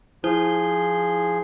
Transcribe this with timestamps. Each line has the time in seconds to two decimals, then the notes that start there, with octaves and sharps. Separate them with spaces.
0.24 F3 E4 G#4 C5 G7